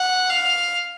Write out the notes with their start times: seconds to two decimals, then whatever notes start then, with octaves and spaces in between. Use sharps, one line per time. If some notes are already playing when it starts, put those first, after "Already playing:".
Already playing: F#5
0.30 F5